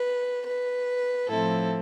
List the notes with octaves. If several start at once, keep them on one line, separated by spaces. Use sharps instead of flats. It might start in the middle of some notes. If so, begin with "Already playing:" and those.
Already playing: B4
B4
A2 F3 C4 E4 A4